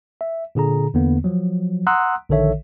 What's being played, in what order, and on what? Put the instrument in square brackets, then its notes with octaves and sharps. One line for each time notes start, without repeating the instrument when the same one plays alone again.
[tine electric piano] E5
A#2 D3 G#4 A#5
E2 D3 A#3 B3
F3 F#3
F#5 A#5 C6 D#6 E6 F#6
A#1 D3 D#3 A4 C#5 E5